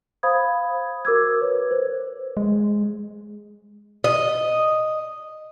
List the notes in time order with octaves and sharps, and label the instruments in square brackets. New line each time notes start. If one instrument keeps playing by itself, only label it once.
[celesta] C5 F5 B5 D#6 G#6
F#4 A#4 D6 E6 G#6
B4 C#5
C5
[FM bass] G#3
[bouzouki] D#5